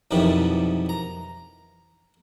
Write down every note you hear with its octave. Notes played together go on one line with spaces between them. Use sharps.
B1 F2 C3 D#3 E3 G3
A#5